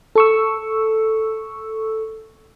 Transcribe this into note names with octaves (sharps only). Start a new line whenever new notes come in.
A4 C#6 E6